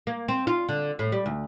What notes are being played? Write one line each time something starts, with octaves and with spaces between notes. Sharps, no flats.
A#3
C4
F4
D3
A2
G3
D2